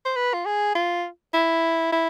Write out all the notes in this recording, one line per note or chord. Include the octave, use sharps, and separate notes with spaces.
C5
B4
F4
G#4
F4
E4
E4